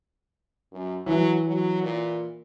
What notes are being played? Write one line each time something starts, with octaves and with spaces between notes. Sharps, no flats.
F#2
E3 F#3
F#3
A#2